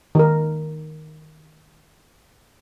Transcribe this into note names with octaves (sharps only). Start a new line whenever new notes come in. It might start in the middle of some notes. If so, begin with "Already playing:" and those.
D#3 A#4